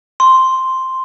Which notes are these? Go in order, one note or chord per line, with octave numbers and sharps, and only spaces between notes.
C6